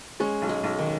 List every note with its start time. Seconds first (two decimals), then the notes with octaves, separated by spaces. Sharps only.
0.20 G#3 C#4
0.42 B1
0.49 G#3
0.64 B1
0.79 D#3